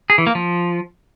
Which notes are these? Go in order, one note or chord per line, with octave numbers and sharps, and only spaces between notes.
G#4
E3
A#3
F3